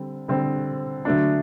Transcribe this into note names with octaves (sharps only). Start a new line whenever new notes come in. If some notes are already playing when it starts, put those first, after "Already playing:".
Already playing: D3 G3 C4
D3 G3 C4
D3 F#3 A3 D4